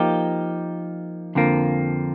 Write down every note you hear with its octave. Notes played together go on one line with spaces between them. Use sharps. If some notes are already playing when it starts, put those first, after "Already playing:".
Already playing: F3 A#3 D#4 G4
F2 D3 F3 A#3